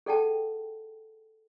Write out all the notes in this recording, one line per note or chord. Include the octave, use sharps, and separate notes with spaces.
G#4 A4 D5 F#5 G5 A5